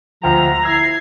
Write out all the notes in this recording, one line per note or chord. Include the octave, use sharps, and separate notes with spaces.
D2 F3 G5 A#5
E4 E6 G#6 C7